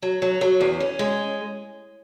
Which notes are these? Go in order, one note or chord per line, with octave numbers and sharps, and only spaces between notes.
F#3
F#3
F#3
E2
C#4
G#3